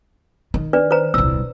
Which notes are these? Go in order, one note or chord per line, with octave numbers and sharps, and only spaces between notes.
D#3
D4 B4 D5
B4 C5 A#5
D#1 C2 E6